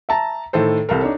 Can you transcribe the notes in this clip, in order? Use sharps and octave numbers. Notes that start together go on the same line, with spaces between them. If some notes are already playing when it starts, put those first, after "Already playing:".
E5 A5 A#5
A2 D#3 A4 C5
C2 A4 A#4
D4 D#4 C#5